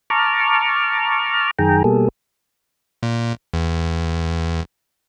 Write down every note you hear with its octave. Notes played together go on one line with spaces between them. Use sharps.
A5 A#5 C#6 D6 F6
F#2 D#3 G#4 G5 A#5
B2 G3 A#3 G#4 A4
A#2
E2